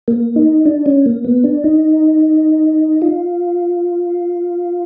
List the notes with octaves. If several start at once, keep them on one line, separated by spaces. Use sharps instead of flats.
A#3
D#4
D4
C#4
A#3
B3
D4
D#4
F4